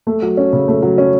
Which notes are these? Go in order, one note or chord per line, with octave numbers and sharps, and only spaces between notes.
A3
F#3
C#4
C#3
A3
F#3
C#4